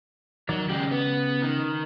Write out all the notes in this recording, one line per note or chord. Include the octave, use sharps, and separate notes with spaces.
D#3 F#3 D5
C#3 G#3 G4
B3
D#3